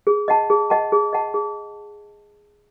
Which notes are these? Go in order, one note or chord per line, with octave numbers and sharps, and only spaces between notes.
G#4
D#5 F#5 A5
G#4
D#5 F#5 A5
G#4
D#5 F#5 A5
G#4